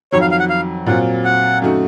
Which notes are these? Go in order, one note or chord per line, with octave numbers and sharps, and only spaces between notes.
F2 D#3 F#3 C#5
F5
F5
F#5
F5
A#2 F#3 C4 F4 F#5
F#5
F#2 D#3 A3 D#4 F#4